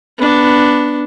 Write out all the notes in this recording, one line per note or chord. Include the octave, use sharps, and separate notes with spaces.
B3 D4